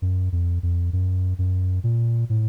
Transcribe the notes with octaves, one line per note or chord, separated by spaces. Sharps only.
F#2
F2
F2
F#2
F#2
A#2
A2